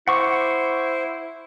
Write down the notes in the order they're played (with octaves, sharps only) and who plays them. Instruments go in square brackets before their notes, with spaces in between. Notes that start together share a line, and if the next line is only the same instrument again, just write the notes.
[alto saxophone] E4 [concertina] C5 [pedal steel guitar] F#5 C#6 D6